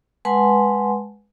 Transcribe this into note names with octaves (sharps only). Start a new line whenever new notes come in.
G#3 B4 F#5 G#5 A5 C6